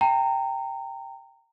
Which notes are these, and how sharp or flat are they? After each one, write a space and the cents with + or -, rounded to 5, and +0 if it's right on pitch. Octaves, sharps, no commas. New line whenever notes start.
G5 +0 A#5 -25